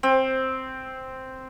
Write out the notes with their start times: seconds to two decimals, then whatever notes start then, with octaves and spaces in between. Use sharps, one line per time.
0.03 C4